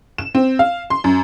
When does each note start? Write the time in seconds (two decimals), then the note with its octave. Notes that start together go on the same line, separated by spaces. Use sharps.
0.18 E7
0.35 C4
0.59 F5
0.90 C6
1.04 F#2